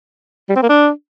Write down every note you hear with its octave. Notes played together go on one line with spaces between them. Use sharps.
G3
C4
A#3
D4